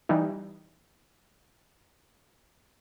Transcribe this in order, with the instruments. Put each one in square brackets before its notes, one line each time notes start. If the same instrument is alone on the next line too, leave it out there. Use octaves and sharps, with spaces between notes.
[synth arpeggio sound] E3 G3 D#4